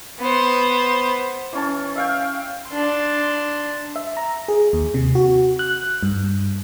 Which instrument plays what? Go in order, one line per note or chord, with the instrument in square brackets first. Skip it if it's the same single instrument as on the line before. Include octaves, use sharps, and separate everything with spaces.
[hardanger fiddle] B3 C5
[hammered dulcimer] E3 C#4 A5
E5 F5 G5
[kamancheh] D4 C6
[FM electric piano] E5
A#5
G#4
D#2
C3
F#4
F#6
G2